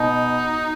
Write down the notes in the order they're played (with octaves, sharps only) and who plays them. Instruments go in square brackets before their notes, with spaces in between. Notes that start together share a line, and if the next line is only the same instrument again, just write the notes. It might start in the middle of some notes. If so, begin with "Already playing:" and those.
Already playing: [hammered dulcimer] B2 [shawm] D#4